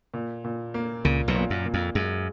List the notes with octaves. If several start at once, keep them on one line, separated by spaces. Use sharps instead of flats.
A#2
A#2
A#3
C#2 A#2 C#3
B1 B2
A#2
F#2
A#2
F2
F#2 G#3